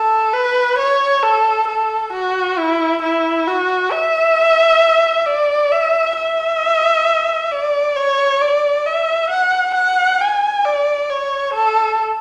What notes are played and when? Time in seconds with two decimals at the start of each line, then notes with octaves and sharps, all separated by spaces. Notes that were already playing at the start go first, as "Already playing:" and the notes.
Already playing: A4
0.33 B4
0.78 C#5
1.23 A4
1.68 A4
2.13 F#4
2.58 E4
3.02 E4
3.47 F#4
3.92 E5
5.26 D5
5.72 E5
6.16 E5
7.51 D5
7.96 C#5
8.41 D5
8.86 E5
9.30 F#5
9.75 F#5
10.20 G#5
10.65 D5
11.09 C#5
11.54 A4